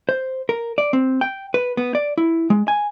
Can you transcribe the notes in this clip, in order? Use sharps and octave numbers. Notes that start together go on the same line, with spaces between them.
C5
A#4
D5
C4
G5
B4
B3
D5
E4
G#3
G#5